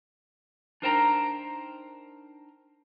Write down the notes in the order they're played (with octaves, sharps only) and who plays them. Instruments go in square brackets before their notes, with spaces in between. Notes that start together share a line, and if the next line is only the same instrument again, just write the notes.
[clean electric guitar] D4 D#4 A#4 C5 G5 A#5